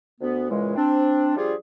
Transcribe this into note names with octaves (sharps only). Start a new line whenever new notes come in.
D2 B3
A#2 C#3 E3 G#3
C4 D4
F3 G3 D4 F4 G4 G#4